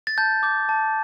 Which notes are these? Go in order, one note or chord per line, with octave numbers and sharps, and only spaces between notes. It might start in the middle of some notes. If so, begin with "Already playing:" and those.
A6
A5 G6
D6 G6
A5